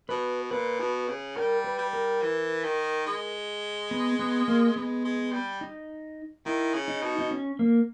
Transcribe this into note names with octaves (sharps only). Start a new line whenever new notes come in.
B2 B4
A#2 B4
B2
C#3
G3 A#4
B4
G3
A#4
E3
D#3
G#3
B3
B3
A#3
G#3 B3
G#3
G3
D#4
D#3 E4
C#3
D#4
B2
D#4
C#4
A#3